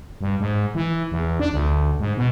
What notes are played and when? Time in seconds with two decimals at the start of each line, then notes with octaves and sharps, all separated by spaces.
0.21 G2
0.40 G#2
0.75 E3
1.11 E2
1.40 D4
1.53 D2
2.00 G#2
2.17 B2